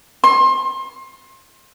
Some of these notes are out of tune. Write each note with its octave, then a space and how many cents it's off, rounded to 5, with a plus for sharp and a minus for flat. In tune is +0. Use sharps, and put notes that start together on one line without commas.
C6 +30